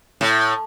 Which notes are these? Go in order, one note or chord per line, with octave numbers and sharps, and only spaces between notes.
A2